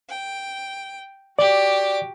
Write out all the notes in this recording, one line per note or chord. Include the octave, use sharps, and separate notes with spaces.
G5
F#4 G4 D5 D6